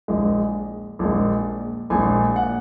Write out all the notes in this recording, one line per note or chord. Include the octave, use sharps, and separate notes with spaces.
A#1 A#2 G#3
A#1 A#2 G#3
A#1 A#2 G#3 G#5
F#5